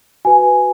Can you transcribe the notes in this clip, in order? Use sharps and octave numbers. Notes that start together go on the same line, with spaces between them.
F#4 B4 G#5